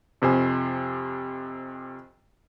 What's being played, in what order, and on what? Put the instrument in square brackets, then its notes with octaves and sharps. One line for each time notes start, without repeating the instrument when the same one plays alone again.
[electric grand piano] F2 C3 C5 G#5